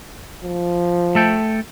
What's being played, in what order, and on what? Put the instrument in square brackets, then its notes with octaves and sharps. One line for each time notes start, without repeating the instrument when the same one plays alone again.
[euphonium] F3
[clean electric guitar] A3 A4 G5